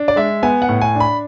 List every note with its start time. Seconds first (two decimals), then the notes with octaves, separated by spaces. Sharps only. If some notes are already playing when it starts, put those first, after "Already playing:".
Already playing: D4
0.08 D5
0.16 G#3 E5
0.43 B3 G#5
0.62 F#5
0.68 A2
0.82 G#5
0.95 D4
1.00 B5